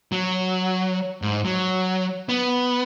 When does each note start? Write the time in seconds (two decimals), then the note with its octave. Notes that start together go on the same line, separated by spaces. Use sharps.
0.12 F#3
1.22 G#2
1.45 F#3
2.29 B3